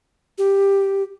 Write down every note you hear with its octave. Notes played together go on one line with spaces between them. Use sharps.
G4